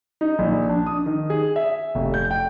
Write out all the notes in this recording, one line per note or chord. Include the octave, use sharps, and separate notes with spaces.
D#4
A#1
D4
D#6
D#3
G#4
E5
F1
G6
G5